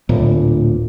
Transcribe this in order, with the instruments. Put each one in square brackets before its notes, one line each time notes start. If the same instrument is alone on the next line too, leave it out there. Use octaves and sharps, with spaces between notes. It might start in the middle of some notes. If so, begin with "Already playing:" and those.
[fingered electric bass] D1 A#2